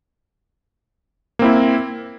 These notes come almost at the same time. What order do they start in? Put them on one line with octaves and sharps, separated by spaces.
A#3 C4 E4